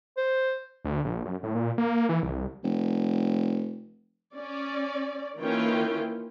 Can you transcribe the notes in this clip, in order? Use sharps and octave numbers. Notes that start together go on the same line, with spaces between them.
C5
D2
A#1
F#2
A2
A#2
A#3
E3
C2
F1
C#4 D5
D#3 E3 A#3 C#4 F4 G5